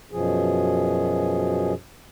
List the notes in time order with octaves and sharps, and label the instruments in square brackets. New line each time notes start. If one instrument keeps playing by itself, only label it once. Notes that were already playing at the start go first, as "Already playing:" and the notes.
[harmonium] F#2 B2 F3 G#4